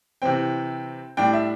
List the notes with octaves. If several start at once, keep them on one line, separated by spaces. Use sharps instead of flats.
C3 E3 C4 G5
A2 G3 D4 G5
E5